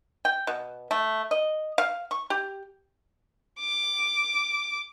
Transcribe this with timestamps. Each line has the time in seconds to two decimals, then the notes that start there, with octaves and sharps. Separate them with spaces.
0.25 G5
0.47 B2
0.91 A3
1.31 D#5
1.78 F5
2.11 C#6
2.30 G4
3.60 D6